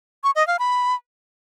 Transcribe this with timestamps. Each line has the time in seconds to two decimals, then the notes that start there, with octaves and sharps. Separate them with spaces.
0.24 C#6
0.36 D#5
0.47 F5
0.59 B5